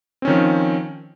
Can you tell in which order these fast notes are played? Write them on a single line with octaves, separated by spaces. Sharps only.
C4 C#4 D#3 F3